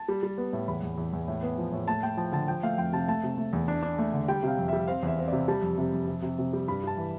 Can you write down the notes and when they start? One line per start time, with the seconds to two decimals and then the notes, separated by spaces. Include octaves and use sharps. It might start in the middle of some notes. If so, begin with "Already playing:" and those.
Already playing: A5
0.08 G3
0.23 G3
0.38 B3
0.53 A2
0.68 E2 B5
0.83 E2
0.98 E2
1.13 E2
1.28 A2
1.43 B3
1.58 F3
1.72 A2
1.88 A3 A5
2.03 A3 G5
2.17 F3 A5
2.32 D3 A5
2.48 F3 G5
2.63 A3 F5
2.77 F2 G5
2.93 C3 A5
3.08 A3 A5
3.23 C3
3.37 A3
3.53 E2
3.68 D4
3.83 D4
3.98 A3
4.13 D3
4.28 G3 G5
4.43 C3 F5
4.58 F2
4.68 G3 E5
4.88 C4 F5
5.03 E2 E5
5.18 C4
5.28 C3 D5
5.48 G3 A5
5.62 F2
5.78 C3
5.92 F2
6.07 C3
6.22 C3
6.38 C3
6.53 G3
6.68 G2 B5
6.83 G2 A5
6.97 E3